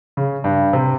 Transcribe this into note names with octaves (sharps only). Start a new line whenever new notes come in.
C#3
G2
C3